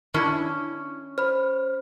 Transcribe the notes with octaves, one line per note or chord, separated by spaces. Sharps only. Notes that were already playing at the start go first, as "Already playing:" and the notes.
D#3 C#4 D4 E4
C5 B5 F6